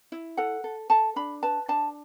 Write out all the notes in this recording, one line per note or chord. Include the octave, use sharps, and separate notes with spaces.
E4
A4 F#5
A4
A4 A5
D4 B5
B4 A5
D4 A5